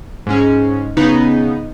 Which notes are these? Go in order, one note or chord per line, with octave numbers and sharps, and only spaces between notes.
G#2 G#3 C#4
C#3 B3 D#4